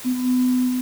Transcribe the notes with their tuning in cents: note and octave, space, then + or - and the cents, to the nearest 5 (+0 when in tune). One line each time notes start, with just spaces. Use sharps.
B3 +35